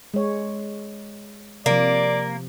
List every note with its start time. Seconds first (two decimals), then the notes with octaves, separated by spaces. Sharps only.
0.14 G#3 C#5
1.66 C3 F3 A#3 D5